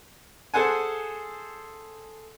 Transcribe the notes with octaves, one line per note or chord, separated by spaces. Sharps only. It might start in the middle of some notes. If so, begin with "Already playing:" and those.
G#4 A4 C5 F#5 G#5